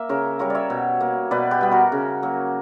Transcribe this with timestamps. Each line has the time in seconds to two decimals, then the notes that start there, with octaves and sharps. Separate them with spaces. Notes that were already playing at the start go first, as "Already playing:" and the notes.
Already playing: A#3 E5
0.09 C#3 A#4 C#5
0.39 G3 A#3 A#4 C#5
0.50 C#5 D5 E5
0.70 B2
1.01 A#3
1.31 B2 B4 D5
1.51 G4 B4
1.61 G3 B3
1.71 F#4 A#4
1.92 C#3
2.23 F#3 A#3